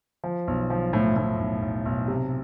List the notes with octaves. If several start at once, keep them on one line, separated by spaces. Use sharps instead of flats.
F3
B1
F3
A2
A2
B1
B1
B1
C3